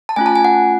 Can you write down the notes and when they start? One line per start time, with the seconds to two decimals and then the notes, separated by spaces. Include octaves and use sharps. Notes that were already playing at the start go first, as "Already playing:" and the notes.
0.09 A5
0.16 A3 C#4 F4 G#5
0.26 A5
0.36 G#5
0.45 F#5